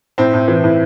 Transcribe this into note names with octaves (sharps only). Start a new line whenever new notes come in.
A2 C4
A2
E3
A2